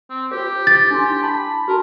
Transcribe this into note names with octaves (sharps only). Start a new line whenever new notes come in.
C4
F4 G4 C5
A6
D4 E4 C6
A5 B5
F#4 A#4 A5